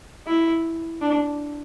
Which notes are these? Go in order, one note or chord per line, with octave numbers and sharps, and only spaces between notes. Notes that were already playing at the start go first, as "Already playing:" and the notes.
E4
D4